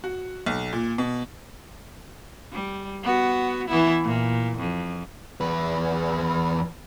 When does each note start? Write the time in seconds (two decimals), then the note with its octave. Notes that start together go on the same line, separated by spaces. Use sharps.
0.04 F#4
0.46 B1
0.73 A#2
0.98 B2
2.52 G3
3.03 B3 F#4
3.68 E3 B3 E4
4.03 A#2
4.58 F2
5.41 E2 B4